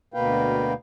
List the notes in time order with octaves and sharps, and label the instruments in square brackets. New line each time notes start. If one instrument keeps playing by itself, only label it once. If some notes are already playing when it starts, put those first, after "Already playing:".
[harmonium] D2 B2 A#3 B4 F5 G5